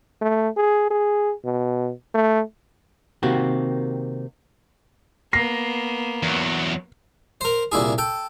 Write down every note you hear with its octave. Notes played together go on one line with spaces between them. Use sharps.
A3
G#4
G#4
B2
A3
C3 D#3 A#3 C4 F#4 G4
A#3 B3 A#6 C7
E2 F#3
A#4 C5
C2 A#2 E4 G#4
A4 G5